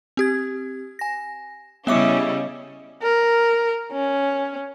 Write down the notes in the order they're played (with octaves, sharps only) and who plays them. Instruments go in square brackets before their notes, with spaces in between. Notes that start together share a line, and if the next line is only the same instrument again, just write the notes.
[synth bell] C4 G4 G#6
G#5 A#6
[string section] C#3 G3 C#4 [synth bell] B3 E5 D6 [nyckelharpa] E4 D#5
[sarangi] A#4
C#4